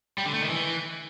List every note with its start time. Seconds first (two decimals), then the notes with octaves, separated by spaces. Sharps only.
0.18 G3
0.26 D3
0.34 A3
0.42 D#3
0.49 E3